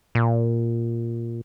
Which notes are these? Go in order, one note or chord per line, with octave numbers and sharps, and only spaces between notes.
A#2